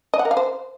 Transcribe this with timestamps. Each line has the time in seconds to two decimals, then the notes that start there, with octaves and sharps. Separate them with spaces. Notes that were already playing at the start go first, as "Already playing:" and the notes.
0.14 D#5
0.19 F#5
0.25 A#4
0.31 F5
0.37 C5